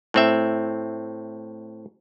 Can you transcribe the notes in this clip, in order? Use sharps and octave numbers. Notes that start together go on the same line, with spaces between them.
A2 C4 E5